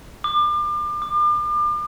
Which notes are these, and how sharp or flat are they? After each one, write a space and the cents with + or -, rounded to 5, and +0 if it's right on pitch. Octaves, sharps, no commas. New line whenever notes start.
D6 +35
D6 +40